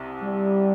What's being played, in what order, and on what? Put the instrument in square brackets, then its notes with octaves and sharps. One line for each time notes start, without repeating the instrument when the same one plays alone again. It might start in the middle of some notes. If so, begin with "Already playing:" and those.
Already playing: [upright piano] C2 C3
[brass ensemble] G3